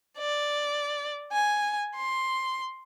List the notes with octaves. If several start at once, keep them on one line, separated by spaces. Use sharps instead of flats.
D5
G#5
C6